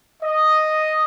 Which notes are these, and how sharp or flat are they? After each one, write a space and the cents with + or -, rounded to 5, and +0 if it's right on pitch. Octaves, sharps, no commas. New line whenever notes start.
D#5 +0